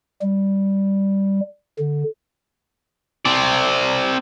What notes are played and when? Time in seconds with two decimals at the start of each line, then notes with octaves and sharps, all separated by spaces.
0.22 G3
1.79 D3
3.25 C4 D5